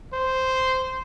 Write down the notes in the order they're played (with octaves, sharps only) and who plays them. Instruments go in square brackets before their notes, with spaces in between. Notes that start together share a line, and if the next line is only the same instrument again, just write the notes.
[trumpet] C5